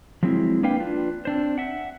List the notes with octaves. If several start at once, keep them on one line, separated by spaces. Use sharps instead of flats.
F3 F#3 G#3 C4 E4
A#3 D4 B4 F5 G5
D4 F4 B4
C4 D4 C5
E5 F#5